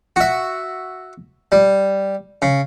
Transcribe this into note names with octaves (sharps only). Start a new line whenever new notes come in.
F#4 E5
G3
C#3